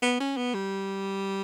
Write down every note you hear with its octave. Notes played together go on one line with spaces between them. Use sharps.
B3
C#4
B3
G3